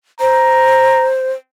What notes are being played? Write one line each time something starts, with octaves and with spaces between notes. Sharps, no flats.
C5 A#5